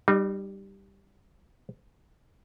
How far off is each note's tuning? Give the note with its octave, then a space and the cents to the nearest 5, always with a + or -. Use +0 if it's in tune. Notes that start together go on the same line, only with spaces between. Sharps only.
G3 +0 D#4 -35